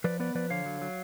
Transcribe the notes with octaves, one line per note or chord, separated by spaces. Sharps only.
F3 B4 D5
B3 B4 D5
F3 B4 D5
D3 C#5 F5
F#3
F#3